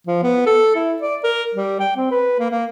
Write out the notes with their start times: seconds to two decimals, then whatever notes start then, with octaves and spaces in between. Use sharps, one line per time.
0.07 F3
0.23 B3
0.46 A4
0.75 E4
1.02 D5
1.24 A#4
1.55 G3
1.80 G5
1.97 C4
2.11 B4
2.39 A#3
2.51 A#3